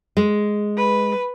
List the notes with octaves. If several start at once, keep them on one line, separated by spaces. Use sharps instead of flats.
G#3
B4